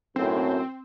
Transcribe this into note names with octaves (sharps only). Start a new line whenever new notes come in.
B1 F#2 A2 C4